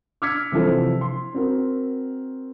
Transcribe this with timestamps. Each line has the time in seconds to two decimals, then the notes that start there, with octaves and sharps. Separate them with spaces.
0.22 D6 E6 F6 G#6 B6 C#7
0.52 C3 E3 F3 A4 C5
1.01 C6
1.34 C4 F#4 A#4